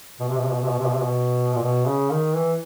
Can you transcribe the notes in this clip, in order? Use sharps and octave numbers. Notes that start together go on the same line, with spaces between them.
B2
C3
B2
C3
B2
C3
B2
C3
B2
C3
B2
A#2
B2
C#3
D#3
E3